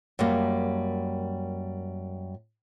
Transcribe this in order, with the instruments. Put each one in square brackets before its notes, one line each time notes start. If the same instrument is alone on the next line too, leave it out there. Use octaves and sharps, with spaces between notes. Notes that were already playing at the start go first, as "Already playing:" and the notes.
[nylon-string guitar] F#2 G3 A#3